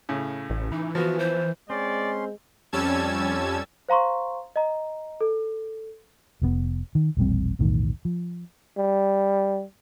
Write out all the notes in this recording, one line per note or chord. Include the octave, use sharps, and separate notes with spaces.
A2 C#3
A1
E3 D#4
F3 B3 F#4
C5
G#3 C4 C#4 D5 C6
F2 G3 C#4 A5 E6 G#6
C5 F5 A#5 C6 C#6
D#5 A#5
A4
F1 A2 B3
D#3
E1 A#1 G3 C4
B1 E2 A2 D#3
F3
G3